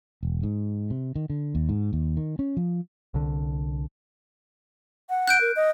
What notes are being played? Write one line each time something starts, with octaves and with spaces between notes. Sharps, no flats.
E1
G#2
C3
D#3
D3
D#2
G#2
D#2
D#3
C#4
F3
C2 D3
F#5
F#6 G6 D7
A#4
D#5